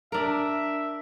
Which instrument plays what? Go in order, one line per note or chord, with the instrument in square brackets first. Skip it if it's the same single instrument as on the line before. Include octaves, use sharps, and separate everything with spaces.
[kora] D4 A#4 [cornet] E5